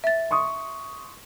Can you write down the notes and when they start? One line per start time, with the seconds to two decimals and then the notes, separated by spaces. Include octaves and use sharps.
0.04 E5 A6
0.31 C6 C#6 D#6